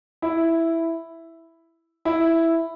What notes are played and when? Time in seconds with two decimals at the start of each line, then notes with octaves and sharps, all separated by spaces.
0.22 E4
2.05 E4